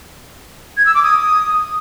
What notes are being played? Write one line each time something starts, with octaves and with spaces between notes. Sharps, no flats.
G#6
E6
D6
D#6